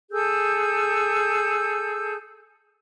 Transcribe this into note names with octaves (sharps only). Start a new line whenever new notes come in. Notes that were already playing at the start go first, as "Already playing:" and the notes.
G#4 A4 E6 G6